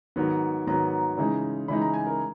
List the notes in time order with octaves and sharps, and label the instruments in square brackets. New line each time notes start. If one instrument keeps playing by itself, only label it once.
[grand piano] G#2 D#3 F#3 B3 C#5
G#2 D#3 F#3 B3 A#5
C#3 E3 G#3 D#4
C#3 E3 G#3 D#4 B5
A#5
G#5
A#4